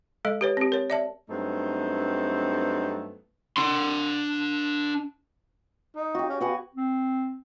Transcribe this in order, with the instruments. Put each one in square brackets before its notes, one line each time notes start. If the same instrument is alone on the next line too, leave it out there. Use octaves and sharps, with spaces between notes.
[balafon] G#3 A4 D#5
G4 B4 C#5
C4 G4
A#4 C#5
D5 E5 A5
[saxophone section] G2 F#3 A3 B3 C4 D#4
[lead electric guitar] D4 C6
[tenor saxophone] D#4
[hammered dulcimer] F#4 G4
[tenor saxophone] C#4
[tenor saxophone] B3 [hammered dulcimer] F#4 F#5 G#5
[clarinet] C4